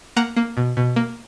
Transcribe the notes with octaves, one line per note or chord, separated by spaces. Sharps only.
A#3 F#5 A#5
A#3
B2
B2
A#3